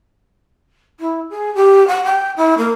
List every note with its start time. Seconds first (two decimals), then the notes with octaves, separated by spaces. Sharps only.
1.00 E4
1.30 G#4
1.55 G4
1.88 F#5
2.04 G5
2.37 E4
2.58 A#3